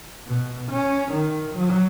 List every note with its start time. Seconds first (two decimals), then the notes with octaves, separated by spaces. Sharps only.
0.27 B2
0.72 C#4
1.12 D#3
1.55 F#3